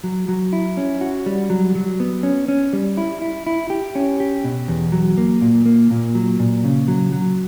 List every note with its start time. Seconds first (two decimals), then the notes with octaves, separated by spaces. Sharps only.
0.04 F#3
0.28 F#3
0.53 E4
0.77 C#4
1.01 F#4
1.26 G3
1.50 F#3
1.75 F#3
2.00 B3
2.23 C#4
2.48 C#4
2.73 G3
2.97 E4
3.22 E4
3.47 E4
3.70 G4
3.95 C#4
4.20 G4
4.44 B2
4.68 E2
4.92 F#3
5.18 A#3
5.42 A#2
5.66 A#3
5.91 A#2
6.15 F#3
6.40 A#2
6.64 C#3
6.88 F#3
7.13 F#3